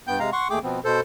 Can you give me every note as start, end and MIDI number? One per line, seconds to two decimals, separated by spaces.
0.07 0.19 43
0.07 0.19 59
0.07 0.19 79
0.07 0.19 91
0.19 0.30 48
0.19 0.30 56
0.19 0.30 77
0.19 0.30 82
0.32 0.48 78
0.32 0.48 84
0.32 0.48 85
0.50 0.59 39
0.50 0.59 57
0.50 0.59 68
0.50 0.59 79
0.50 0.59 86
0.63 0.80 47
0.63 0.80 53
0.63 0.80 59
0.63 0.80 60
0.84 1.01 47
0.84 1.01 69
0.84 1.01 72